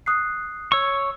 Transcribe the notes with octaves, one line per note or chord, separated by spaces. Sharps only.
D#6 F#6 C7
C#5 C#6 E6